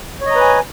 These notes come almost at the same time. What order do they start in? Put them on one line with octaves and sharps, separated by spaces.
C#5 D#5 A#5 B4 G#5